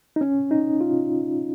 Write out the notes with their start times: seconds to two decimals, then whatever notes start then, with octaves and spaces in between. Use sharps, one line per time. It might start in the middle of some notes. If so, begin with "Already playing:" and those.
0.16 D#4
0.21 C#4
0.51 D#4
0.81 F4